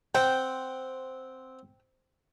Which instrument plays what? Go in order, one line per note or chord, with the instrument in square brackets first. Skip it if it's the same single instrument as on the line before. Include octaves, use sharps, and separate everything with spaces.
[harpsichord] C4 F#5 [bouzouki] G5